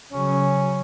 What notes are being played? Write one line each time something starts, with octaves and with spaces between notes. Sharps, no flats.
C#3 F#3 C#4